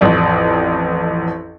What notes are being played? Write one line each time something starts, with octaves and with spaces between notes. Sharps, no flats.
A1 F2 D5